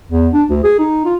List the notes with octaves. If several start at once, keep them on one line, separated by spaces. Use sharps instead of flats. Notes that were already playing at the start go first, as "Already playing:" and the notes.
E2
D4
D2
G#4
D#4
F4